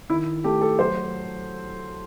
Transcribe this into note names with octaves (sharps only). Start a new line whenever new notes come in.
D#3 E4
A3 G4
A4
F#3 C5